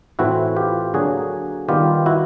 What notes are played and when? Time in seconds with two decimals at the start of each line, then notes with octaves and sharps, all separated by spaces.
0.19 A2 E3 A3 C4 E4 F#4
0.56 F4 G4
0.94 D3 F#3 A#3 F#4 G#4
1.69 D#3 G3 B3 F4 G4
2.06 E4 F#4